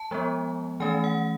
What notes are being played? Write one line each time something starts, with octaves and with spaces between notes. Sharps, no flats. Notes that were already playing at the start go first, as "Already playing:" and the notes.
Already playing: A5
F3 G#3 B3
E3 A3 C#4 G#5
F#5